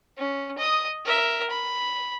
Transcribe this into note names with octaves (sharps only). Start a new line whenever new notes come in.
C#4
D#5 D#6
A#4 E5
B5